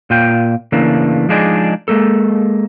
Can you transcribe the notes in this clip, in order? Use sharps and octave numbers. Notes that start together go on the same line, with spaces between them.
A#2 F4 G5
C#3 E3 A3 A#3 D4
F3 G#3 D4 D#4 G#4 D5
G#3 A#3 A4